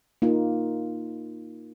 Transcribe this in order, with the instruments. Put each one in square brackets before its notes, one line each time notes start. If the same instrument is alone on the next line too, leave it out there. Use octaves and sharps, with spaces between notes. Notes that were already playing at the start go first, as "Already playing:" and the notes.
[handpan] A#3 D#4 F4